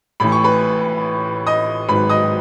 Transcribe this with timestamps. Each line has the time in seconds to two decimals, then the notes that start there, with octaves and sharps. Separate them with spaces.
0.20 A1 A2 E3 B5
0.32 C#6
0.44 B4 B5
1.47 D#5 D#6
1.89 G#1 G#2 D#3 F#3 B4 B5
2.10 D#5 D#6